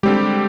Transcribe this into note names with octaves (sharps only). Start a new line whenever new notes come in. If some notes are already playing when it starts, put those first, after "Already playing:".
D3 G3 G#3 C4 G4